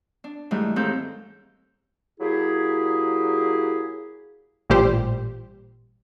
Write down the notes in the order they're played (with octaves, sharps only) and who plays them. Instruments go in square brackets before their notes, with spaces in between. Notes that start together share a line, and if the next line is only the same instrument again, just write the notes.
[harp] D4
G#2 E3 G3 A3
D#2 G#2 C4 D#4 A4 G6
[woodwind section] F#3 A#3 E4 G4 G#4
[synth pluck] A1 A#2 G3 G4 C5